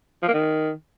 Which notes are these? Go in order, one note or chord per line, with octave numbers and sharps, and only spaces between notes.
F3
A#3
D#3